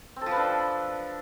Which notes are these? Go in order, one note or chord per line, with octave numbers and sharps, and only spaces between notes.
C4
A4
F3
B4
D4